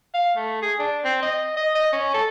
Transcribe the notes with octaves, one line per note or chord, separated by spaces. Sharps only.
F5
A3
G#4
D4
C4
D#5
D#5
D#5
C#4
A4